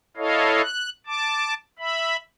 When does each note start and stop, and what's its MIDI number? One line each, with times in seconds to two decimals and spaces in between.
0.17 0.62 64
0.17 0.62 69
0.17 0.62 73
0.17 0.62 75
0.17 0.62 77
0.62 0.90 90
1.06 1.54 81
1.06 1.54 86
1.79 2.17 76
1.79 2.17 83